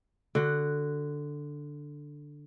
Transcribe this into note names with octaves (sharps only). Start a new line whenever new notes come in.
D3 F#4